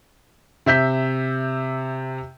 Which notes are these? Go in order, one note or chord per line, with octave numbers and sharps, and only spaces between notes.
C3 E5 G6 B6